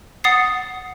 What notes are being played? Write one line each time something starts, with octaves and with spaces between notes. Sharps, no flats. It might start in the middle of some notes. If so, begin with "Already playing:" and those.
F#5 D#6 A6 C7